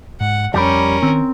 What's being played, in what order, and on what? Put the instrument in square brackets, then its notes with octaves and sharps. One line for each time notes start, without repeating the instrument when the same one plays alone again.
[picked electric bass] G#2 [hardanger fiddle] F#5
[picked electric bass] F2 [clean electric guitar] G3 G4 B5 [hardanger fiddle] C#4 A#4
[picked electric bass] D#3 [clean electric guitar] C4